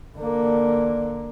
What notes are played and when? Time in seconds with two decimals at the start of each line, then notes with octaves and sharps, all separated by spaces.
0.18 D3 A#3